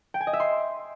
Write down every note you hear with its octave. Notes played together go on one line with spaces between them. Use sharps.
G5
G#5
D#5
E5
C6